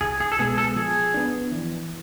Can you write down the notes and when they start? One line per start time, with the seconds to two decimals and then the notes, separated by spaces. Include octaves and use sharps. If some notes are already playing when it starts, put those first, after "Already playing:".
0.01 C2 G#4
0.20 G#4
0.32 A4
0.39 B2 G#3 B3 G#4
0.58 A4
0.76 F3 G#4
1.14 B3 D4
1.52 E3